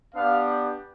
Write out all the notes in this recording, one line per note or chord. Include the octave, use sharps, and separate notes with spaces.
B3 D4 G4 F5